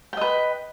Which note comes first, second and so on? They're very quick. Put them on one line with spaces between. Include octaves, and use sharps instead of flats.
G5 D#5 B4